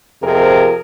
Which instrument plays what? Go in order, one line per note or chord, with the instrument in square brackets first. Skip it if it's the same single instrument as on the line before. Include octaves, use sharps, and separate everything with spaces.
[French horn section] F2 C3 F3 G#4 A#4